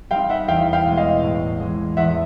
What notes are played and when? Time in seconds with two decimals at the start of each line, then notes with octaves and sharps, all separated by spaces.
0.11 G3 C4 D#4 F5 G5
0.29 E5 F#5
0.48 E2 F5 G5
0.73 F5 G5
0.85 B2 G#3
0.97 D#5 F5
1.23 A2
1.60 E3 G#3
1.97 E2 E5 F#5